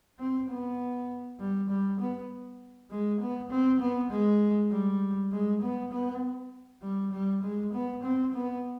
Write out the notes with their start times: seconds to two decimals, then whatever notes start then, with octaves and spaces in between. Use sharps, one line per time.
0.19 C4
0.48 B3
1.40 G3
1.69 G3
2.00 B3
2.90 G#3
3.20 B3
3.50 C4
3.80 B3
4.11 G#3
4.71 G3
5.32 G#3
5.62 B3
5.92 B3
6.82 G3
7.12 G3
7.42 G#3
7.73 B3
8.03 C4
8.34 B3